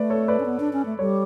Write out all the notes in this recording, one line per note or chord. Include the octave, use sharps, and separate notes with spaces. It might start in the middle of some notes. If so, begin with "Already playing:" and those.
Already playing: A3 B4 D5
A4 C#5
B4 D5
C#4
B3
D4
C#4
A3
G3 A4 C#5